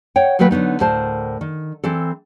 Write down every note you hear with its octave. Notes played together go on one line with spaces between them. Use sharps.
C#5 F#5 G5
D#3 F#3 A3 A#3 B4 G5
D3 F#3 B3 D#4
D2 A2 A#4 C5 A5
D#3
E3 C4 A4